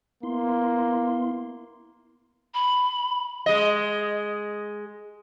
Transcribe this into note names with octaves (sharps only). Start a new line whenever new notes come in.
A#3 B3 E4 C6
B5
G#3 D#5